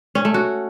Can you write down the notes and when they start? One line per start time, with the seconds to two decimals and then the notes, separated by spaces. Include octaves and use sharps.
0.15 C#4
0.25 A3
0.34 F#4